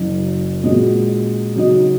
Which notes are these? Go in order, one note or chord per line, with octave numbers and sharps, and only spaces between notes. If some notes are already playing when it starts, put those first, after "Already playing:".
Already playing: F#1 F#2 F#3 C#4
A#2 G#3 C#4 F#4 D#5
C#3 F#3 D#4 F#4 D#5